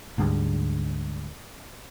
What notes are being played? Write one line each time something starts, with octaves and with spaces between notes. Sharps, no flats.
D2 G#2 G3 G#3